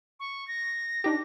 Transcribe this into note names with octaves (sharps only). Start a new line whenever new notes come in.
C#6
A#6
D4 D#4 G4